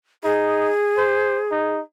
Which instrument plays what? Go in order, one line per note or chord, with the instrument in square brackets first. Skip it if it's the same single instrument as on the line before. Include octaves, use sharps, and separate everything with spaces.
[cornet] D#4 [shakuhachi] G#4
[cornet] C5
D#4